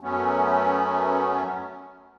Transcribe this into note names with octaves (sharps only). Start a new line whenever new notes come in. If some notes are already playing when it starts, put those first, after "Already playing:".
F#2 F#3 A3 B3 C#4